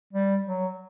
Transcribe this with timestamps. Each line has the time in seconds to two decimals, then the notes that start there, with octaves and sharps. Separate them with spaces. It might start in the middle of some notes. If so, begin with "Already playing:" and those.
0.13 G3
0.45 F#3